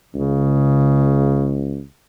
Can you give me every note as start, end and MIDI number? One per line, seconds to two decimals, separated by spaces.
0.15 1.82 37
0.15 1.79 49